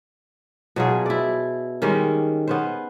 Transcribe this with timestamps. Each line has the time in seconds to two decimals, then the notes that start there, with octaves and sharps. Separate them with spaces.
0.76 B2 F#3 F4 G#4
1.06 E4 D5
1.82 D#3 G3 G#3 C#4
2.47 B3 C#4 C5